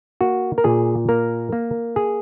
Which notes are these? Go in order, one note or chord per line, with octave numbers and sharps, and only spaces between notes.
A#3 F#4
A#4
A#2 G#4
A#3 A#4
A#3
G#4